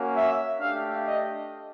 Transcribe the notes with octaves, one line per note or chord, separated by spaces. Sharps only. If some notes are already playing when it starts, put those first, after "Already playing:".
Already playing: A#3 C#4 F#4
E5
A3 D4 G4 F5
D#5